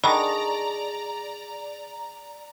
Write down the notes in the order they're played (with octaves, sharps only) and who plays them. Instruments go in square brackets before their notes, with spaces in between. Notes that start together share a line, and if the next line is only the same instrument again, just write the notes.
[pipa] D3 D#3 [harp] G#4 C#6 D#6 [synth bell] D5 A#5 [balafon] B5